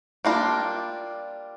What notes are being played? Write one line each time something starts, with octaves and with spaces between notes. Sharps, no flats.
G3 A#3 D4 F4